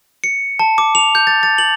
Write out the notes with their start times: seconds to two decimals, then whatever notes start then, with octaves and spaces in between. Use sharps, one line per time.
0.24 C#7
0.59 A5
0.78 D6
0.95 F7
1.15 G6
1.27 A6
1.43 A6
1.58 F#7